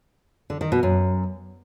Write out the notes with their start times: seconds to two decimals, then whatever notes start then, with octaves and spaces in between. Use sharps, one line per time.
0.50 D3
0.61 D#3
0.72 B2
0.83 F#2